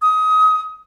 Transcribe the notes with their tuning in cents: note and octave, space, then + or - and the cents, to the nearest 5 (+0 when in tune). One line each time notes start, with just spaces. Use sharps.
D#6 +25